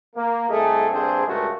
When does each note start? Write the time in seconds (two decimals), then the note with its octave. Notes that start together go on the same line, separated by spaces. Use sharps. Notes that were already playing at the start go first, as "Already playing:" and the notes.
0.15 A#3
0.49 C2 A3 D#4 G#4 A4
0.90 A#1 G2 C4 D4 G#4 C5
1.26 C#2 G2 G#3 A3 F#4 A#4